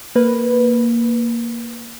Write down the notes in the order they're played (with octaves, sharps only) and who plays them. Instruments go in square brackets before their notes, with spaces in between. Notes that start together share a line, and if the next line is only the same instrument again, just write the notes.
[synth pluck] A#3 B4